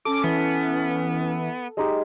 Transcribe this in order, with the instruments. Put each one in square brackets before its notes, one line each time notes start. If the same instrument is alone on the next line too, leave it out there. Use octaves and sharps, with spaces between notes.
[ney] C#4 [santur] A4 [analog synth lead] D6
[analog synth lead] E3 [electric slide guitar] B3
[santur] G#3 D#4 G4